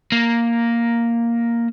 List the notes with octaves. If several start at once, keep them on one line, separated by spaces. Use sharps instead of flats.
A#3